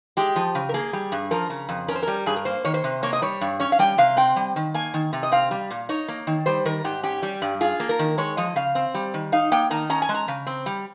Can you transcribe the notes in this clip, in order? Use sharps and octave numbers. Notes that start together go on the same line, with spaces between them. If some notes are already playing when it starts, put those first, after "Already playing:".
G#3 G4
F3
C#3
A#4
A#3 G#4
G3
G2
F3 A#4
C#3
F2
C#4 A#4
C5
G3 A#4
G2 G#4
A#4
A#3 C5
D#3 C#5
C5
C3
A#3 C#5
D#5
G3 C#5
G2
C#4 C#5
F5
G3 G5
C3 F5
C4 G5
G3
D#3
A#3 G#5
D#3
C3
D#5
C4 F5
G3
A#2
D#4 C#5
A#3
D#3
G3 C5
D#3 A#4
G#2 G4
C#4 G4
G3
G2
F4 G#4
A#3
A#4
D#3
G#3 C#5
F3 D#5
C#3 F5
C4
G3
D#3
D#4 F5
A#3 G5
D#3 A#5
C#4 A#5
G#5
G#3
A#5
C#3
C4
G3